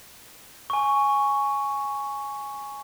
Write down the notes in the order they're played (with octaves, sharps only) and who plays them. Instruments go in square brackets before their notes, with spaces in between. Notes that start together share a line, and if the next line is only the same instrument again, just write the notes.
[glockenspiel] G#5 C#6